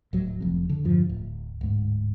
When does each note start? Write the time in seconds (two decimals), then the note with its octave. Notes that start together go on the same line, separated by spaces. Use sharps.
0.13 D1 F#3
0.40 F1 F2
0.69 D3
0.84 E2 G2 F3
1.09 D1
1.61 D1 G#2